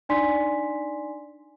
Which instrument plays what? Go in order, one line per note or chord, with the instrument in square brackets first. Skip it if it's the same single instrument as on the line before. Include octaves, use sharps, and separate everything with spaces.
[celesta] D4 D#4 D5 G#5 C6 B6